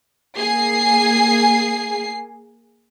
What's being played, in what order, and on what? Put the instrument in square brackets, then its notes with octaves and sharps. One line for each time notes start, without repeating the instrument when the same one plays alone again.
[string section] A#3 G#4 C7